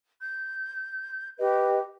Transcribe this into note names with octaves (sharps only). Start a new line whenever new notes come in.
G6
G4 B4 D#5